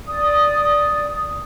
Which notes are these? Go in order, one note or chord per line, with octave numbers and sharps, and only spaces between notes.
D5 D#6